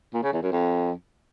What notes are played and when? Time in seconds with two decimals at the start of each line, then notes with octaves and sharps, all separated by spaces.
0.14 A#2
0.23 C#3
0.33 E2
0.42 F#2
0.52 F2